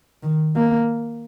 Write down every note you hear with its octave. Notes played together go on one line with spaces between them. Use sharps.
D#3
A#3